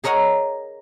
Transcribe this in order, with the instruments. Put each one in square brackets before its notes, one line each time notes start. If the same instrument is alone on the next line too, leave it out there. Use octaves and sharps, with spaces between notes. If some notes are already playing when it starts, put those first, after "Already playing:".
[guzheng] G#4 A#4 C#5 D#5 F#5